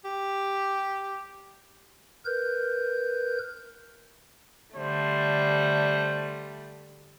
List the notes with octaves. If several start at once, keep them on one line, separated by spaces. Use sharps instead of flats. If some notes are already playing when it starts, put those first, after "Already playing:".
G4
A#4 B4 G6
D3 G3 A3 C5